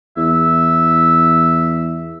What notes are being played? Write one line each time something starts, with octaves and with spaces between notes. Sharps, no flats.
E2 E5